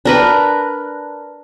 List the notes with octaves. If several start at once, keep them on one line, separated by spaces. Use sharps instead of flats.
D4 A#4 B4